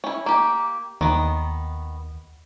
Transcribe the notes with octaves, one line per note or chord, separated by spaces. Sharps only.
C#4 E4
A#3 G4
D#2 D#3 B3